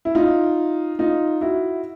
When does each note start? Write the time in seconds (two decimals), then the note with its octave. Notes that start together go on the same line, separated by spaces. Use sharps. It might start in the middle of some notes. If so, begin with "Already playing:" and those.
0.05 E4
0.15 D#4 F4
0.99 D#4 F4
1.41 E4 F#4